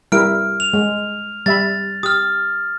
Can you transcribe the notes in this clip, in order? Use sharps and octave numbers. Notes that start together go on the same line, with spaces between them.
G3 E4 A#4 F6 D7
F7
G#3
G3 E5 B5 A6
G4 D#6 F6